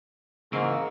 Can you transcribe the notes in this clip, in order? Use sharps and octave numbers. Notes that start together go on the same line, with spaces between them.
G#2 C#3 E3 A#3 A#4 C#6 E6